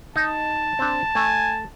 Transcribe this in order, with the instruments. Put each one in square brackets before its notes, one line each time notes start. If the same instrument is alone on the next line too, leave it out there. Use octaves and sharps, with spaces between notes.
[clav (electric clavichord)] D#4 [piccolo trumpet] A5
[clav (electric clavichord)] C4 D4
[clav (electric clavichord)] A3 [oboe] G#5